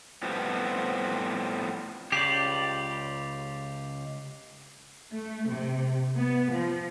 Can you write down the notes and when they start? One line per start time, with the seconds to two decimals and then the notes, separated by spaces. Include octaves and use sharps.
0.23 A2 F3 G3 B3 C4
2.12 C#2 G4 D5 C7 F7
5.12 A3
5.51 C3
6.16 B3
6.51 F3